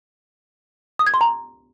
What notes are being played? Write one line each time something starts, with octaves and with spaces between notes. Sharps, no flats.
D#6
G#6
C6
A#5